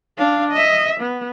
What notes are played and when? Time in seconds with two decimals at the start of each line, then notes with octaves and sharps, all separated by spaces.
0.18 D4 F5
0.52 D#5 E5
1.01 B3